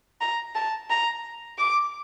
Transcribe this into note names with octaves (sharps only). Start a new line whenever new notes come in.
A#5
A5
A#5
D6